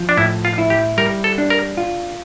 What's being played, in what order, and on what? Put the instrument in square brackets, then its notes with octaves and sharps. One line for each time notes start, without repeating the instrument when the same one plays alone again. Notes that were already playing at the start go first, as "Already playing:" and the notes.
Already playing: [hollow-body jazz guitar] F3
[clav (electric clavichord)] D4
[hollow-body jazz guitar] A2 [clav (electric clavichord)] E4
[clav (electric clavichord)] F4
[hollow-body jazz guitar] E4
[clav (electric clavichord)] G4
[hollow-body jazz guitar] G3 [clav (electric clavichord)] A#4
[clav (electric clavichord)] A4
[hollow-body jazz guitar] D4
[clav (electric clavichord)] A#4
[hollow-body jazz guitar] F4